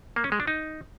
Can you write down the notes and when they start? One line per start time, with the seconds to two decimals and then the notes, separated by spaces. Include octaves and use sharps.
0.16 A#3
0.24 C#4
0.32 G#3
0.40 D4
0.47 D#4